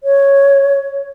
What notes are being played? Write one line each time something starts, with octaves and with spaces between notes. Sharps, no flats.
C#5